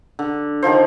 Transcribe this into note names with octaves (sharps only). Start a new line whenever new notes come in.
D3
D3 D#3 F3 C5